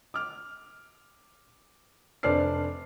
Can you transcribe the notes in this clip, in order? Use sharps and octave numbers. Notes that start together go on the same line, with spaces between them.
D6 F6
F1 D4 C5 D5 F6 C7